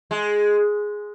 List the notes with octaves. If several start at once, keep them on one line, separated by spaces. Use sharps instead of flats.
G#3